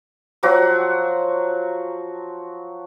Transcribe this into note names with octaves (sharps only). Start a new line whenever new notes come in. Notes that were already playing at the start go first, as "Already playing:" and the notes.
F3 F#3 F#4